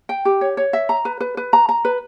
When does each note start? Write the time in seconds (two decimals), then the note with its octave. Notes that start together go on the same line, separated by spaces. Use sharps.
0.09 G5
0.25 G4
0.41 C#5
0.57 C#5
0.73 E5
0.89 A#5
1.05 B4
1.20 B4
1.37 B4
1.53 A#5
1.69 A#5
1.85 B4